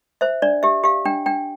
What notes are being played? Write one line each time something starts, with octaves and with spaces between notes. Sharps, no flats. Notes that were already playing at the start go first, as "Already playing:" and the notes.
C5 E5
D4 D5
G4 E5
G4 F5
D4 G5
D4 G5